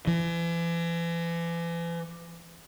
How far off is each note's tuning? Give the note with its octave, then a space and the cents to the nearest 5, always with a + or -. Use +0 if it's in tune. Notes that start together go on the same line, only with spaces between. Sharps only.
E3 +40